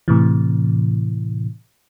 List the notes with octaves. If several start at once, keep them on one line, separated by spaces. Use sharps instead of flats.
A2 C3 E3